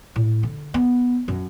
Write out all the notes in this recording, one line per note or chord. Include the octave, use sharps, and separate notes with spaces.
A2
D3
B3
F#2